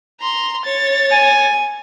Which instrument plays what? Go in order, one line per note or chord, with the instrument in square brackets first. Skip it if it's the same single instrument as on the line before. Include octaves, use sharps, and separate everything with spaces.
[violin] A#5 C6
C#5 A6
[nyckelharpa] G#5